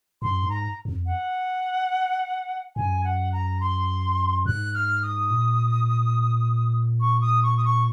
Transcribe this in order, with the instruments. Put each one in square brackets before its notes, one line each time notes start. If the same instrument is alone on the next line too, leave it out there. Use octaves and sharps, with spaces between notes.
[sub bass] F#2 [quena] C6
[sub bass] G#2
[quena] A#5
[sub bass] F2
[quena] F#5
[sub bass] F#2 [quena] G#5
[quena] F#5
A#5
C6
[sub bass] G#2 [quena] F#6
[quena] F6
D#6
[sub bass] A#2
[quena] C#6
D#6
C#6
D#6
C#6